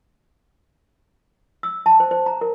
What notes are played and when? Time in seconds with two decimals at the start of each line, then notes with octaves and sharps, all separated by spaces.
1.63 E6
1.86 A5
2.00 C5
2.11 C5
2.26 A#5
2.41 A#4